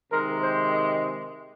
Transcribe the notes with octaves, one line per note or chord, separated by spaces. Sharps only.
C3 D#3 G#3 A#4
C5
D#5